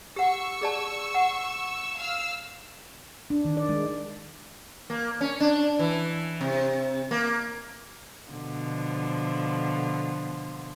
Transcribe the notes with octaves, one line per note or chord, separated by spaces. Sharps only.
G4 F#5 C#6 E6
G#4 D5 A5
F#5
F5 E6 F6
D4
D#3
D5
G#3
A#3
C#4
D4
E3
C3
A#3
B2 D3 F3